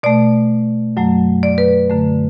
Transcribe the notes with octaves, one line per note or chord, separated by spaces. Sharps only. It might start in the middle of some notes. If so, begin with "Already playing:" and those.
B2 A3 D5
F#2 F#3 A3
D5
B4
F#2 D3 A3